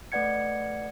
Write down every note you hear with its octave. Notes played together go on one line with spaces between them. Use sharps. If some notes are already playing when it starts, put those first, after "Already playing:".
A3 B4 D5 F#5 G#6 C#7